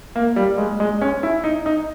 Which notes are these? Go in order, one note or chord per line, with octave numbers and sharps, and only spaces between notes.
A#3
G3
G#3
G#3
C#4
E4
D#4
D#4